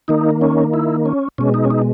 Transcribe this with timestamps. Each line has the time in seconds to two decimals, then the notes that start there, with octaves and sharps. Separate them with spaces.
0.08 D#3 A#3 D#4
0.41 C#4
0.73 E4
1.06 C#4
1.38 B2 G#3 C#4
1.54 D#4
1.65 C#4
1.70 D#4